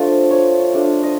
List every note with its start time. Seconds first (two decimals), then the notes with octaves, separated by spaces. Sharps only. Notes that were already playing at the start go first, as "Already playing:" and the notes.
Already playing: F3 A3 D4 F4 D#5
0.31 C#5
0.74 A3 D4 F4 D5
1.03 D#5